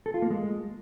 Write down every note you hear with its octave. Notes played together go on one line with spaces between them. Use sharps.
A4
F4
A#3
G#3